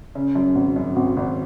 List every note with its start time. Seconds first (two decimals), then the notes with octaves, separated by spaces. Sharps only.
0.15 C#3
0.36 F#2
0.55 G#1
0.76 F#2
0.96 G#1
1.17 G#1